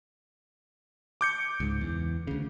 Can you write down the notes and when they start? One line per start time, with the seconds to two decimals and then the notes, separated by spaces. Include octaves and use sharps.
1.21 D6 G6 C#7
1.60 C#2 G#2
1.81 E2
2.27 D2 C#3